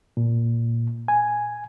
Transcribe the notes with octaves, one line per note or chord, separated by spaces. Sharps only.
A#2
G#5